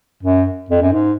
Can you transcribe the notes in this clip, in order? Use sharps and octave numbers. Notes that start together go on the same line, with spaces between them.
F#2
F2
F#2
G#2